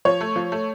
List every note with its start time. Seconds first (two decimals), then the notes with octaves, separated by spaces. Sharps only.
0.05 F3 C#5
0.21 A3
0.36 F3
0.52 A3